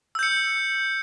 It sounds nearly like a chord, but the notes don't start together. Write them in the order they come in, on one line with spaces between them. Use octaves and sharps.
E6 G6 C#7